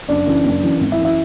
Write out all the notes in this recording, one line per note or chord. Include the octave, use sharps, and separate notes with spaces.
F#1 D4 D5
F#2 C#3 E3
F#1
F#2 C#3 E3
G#1
E4 E5
F#2 E3
E4 E5